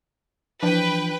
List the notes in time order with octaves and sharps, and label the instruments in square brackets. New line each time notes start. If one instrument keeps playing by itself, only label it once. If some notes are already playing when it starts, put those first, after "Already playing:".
[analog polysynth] E3 F3 D4 [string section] B4 G5